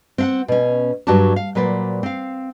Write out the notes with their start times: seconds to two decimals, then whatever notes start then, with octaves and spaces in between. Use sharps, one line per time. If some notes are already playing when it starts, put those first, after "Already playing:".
0.18 C4 F5 F#5
0.48 B2 C#4
1.07 G2 F#3 F#4 G4 D5 A5
1.36 F5
1.55 A#2 F#3 B4 C5 D5
2.03 C4 F5